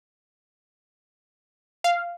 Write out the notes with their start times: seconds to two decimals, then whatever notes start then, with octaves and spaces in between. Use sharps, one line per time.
1.84 F5